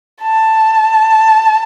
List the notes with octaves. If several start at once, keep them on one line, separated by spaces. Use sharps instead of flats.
A5